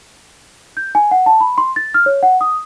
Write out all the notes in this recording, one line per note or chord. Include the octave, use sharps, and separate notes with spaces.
G6
G#5
F#5
A5
B5
C6
A6
F6
C#5
F#5
D#6